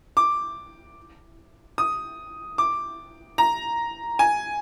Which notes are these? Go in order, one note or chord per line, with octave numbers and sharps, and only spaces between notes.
D6
D#6
D6
A#5
G#5